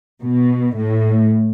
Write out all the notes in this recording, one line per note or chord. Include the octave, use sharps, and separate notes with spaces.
B2
A2